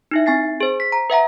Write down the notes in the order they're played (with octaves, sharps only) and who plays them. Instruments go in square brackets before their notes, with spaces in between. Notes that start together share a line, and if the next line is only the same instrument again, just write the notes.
[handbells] D#4 E4 E5
C4 G#5 A6 C7
G#4 C5
B6
A#5
B4 E5 F#5 A#5